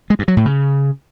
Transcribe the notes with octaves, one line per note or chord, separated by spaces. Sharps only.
G#3
G2
F#3
A2
C#3